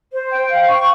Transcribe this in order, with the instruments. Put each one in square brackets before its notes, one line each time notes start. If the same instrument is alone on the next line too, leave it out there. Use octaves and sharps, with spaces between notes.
[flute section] C5
G5
F5
C#6